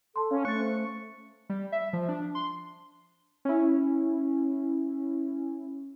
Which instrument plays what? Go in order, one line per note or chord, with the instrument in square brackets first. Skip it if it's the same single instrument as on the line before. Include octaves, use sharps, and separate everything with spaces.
[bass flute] A4 [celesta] A5 C6
[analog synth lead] C#4 [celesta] F5
[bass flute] A3 [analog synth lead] C#6 [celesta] F#6 A6
[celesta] C5
[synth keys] G3
E5
F3
D4
C6
C#4 E4